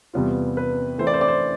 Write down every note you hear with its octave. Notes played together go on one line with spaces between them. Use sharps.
E2 C3 G3 B3 F4
B4
E3 A3 C4 E4 C5
D5
C5
D5
C5